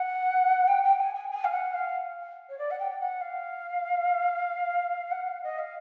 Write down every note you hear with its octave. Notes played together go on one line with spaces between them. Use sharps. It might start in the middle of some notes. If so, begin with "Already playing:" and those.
Already playing: F#5
G5
G5
G#5
G#5
G#5
F5
F#5
F5
C#5
D5
F#5
G5
F#5
F5
F#5
F5
D#5
F5